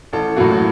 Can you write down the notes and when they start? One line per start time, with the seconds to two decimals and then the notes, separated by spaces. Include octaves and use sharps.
0.13 A1 A4
0.36 A2 F#3 A#3 F#4
0.51 F#4